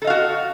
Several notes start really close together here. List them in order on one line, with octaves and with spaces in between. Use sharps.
A4 D#5 F5 F#4